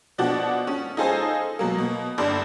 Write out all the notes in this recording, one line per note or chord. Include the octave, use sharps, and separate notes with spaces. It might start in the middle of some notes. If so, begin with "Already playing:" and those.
B2 F3 D4 F#4 D5 F#5
C#4
D#4 F4 G#4 A4 C5 G#5
B2 F#3 A#3
B2
G1 G2 A4 D5 C6